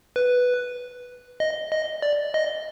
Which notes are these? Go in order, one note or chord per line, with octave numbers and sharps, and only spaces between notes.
B4
D#5
D#5
D5
D#5